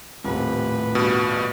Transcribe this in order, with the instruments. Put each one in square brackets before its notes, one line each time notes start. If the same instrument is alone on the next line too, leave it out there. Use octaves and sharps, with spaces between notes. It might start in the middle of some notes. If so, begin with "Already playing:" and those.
[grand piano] D#1 C3 [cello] A2 B4
[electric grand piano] G2 B2